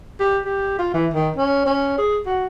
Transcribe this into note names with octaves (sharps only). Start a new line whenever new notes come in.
G4
G4
F4
E3
D#3
C#4
C#4
G#4
F#4